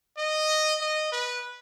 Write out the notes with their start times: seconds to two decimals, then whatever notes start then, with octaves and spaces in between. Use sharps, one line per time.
0.18 D#5
0.81 D#5
1.12 B4